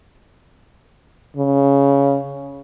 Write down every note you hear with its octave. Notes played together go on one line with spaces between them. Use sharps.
C#3